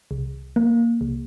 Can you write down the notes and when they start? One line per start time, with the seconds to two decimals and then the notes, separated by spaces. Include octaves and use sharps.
0.11 C2
0.56 A#3
1.01 C2